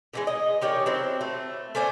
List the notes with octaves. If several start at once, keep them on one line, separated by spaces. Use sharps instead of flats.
D3 E3 G#3
D#5
D#3 G4 C#5 D5
F#3 C4 E4
A3
A3 C#4 D4 C5